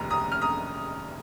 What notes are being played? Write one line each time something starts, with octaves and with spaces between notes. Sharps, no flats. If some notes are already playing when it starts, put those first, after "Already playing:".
Already playing: F1 D#2 C#3 A#5
A#5 D#6
F6
A#5 D#6